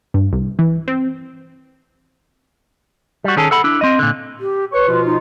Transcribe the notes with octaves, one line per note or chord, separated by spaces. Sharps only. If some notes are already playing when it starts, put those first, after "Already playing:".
G2
C2
E3
C4
G3 F#4
D#3 C#4 G#4 A4
A4 F#5 B5
D4 E4
C4 D#5
A#2 D3
G4
B4 C#5 C#6
B2 F3 F4
D#4